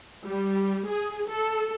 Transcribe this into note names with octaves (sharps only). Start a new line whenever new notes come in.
G3
G#4
A4